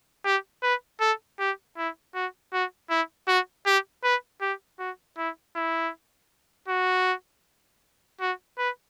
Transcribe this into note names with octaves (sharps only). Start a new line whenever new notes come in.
G4
B4
A4
G4
E4
F#4
F#4
E4
F#4
G4
B4
G4
F#4
E4
E4
F#4
F#4
B4